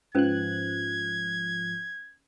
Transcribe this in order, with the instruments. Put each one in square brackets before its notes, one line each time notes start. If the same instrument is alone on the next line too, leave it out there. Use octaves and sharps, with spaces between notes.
[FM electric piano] G#2 F3 F#6 [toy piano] C#4 B4 [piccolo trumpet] G#6